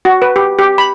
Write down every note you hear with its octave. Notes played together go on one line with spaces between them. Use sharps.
F#4
B4
G4
G4
B5